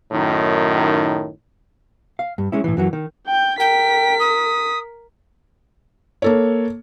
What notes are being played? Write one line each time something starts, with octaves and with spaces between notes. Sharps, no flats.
F#2 A2 D#3
F5
G2
G#3 C#4 E4
A2 E3
F#2 E3 F#3
D#3
G5 G6
A#4 G5 B6
D#6
A#3 A4 C#5